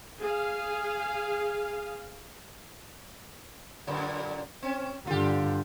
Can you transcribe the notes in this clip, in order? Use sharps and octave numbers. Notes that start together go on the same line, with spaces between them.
G#4 F5
F#2 A#2 D3
C4 C#4
G2 D3 F4 G4